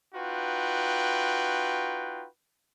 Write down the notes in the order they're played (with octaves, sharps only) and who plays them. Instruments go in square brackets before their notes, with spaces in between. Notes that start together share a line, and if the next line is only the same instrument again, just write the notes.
[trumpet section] D#4 F4 F#4 B4 G5